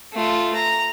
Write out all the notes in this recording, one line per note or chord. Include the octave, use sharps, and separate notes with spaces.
A3 F4
A#5